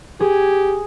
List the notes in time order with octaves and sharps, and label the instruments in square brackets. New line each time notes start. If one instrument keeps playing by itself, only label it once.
[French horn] G4 [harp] G#4